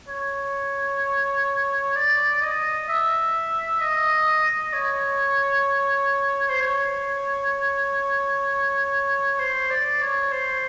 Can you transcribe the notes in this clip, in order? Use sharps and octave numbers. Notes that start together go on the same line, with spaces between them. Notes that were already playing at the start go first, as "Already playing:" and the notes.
C#5
D5
D#5
E5
D#5
C#5
C5
C#5
C5
D5
C#5
C5